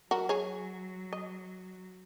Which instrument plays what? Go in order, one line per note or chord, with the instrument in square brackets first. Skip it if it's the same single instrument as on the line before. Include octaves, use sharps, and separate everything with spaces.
[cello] F#3 [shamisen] F#4 A#4
[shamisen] G#4 C#5
D#5